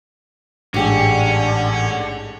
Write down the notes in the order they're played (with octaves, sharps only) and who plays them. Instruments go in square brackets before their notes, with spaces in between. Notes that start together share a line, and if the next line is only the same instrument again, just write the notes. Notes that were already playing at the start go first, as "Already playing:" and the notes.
[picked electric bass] A1 [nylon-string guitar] G#2 G4 G#4 [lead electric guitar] D3 [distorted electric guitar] C#4